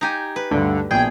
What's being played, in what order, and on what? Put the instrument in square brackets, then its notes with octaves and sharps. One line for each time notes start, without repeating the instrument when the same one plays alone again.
[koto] D#4 G4 G#5
B4
[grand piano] D2 G2 [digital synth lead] D3
[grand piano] A#1 B2 G#6 [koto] G#4 [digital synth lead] G5